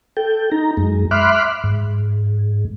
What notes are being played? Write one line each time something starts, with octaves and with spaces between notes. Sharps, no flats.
A4 G5
D#4 A#5
F#2 G#3
E5 B5 C6 D6 F6 F#6
G#2